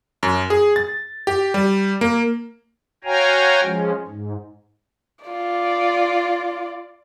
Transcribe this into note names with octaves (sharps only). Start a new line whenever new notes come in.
F#2
G#4
A6
G4
G3
A#3
F#4 C#5 F5 G5 G#5 A#5
F3 G#3 C#4
G#2
F4 D5